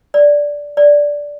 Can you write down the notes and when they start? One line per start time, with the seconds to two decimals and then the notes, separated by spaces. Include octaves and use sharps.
0.14 D5
0.77 D5